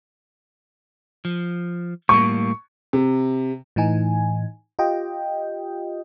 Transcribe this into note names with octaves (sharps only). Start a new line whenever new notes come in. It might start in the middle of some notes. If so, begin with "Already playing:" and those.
F3
A2 G3 A#3 C#6
C3
A2 E3 D#4 G#5
F4 G4 D#5 G5